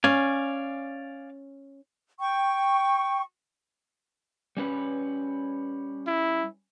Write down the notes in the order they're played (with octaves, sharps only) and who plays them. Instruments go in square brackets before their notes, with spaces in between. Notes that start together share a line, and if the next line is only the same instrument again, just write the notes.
[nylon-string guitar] C#4 [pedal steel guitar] D5 F5 G#5
[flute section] G5 C#6
[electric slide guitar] G3 C#4 B4
[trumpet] E4